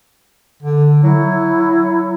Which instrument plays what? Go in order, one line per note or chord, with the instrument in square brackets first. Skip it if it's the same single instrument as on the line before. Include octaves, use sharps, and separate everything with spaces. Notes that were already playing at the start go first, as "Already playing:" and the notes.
[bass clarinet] D3
[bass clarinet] F#3 [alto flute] E4